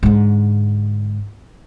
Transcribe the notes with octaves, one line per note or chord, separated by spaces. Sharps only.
G#2 D3